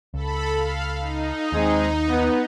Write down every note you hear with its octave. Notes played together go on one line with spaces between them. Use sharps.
C#2 A4 B5
F5
D#4
D#2 G#3 C4 G#4
B3